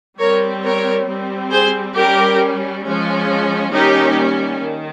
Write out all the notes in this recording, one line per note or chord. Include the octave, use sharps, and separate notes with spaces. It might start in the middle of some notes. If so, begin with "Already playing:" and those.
G3 C4 A#4 C#5
A#4 C#5
G3 C4
G#4 C5
G3 C#4 G4 A#4
F3 G#3 C#4
D#3 G3 A#3 C#4 D#4 G4
D#3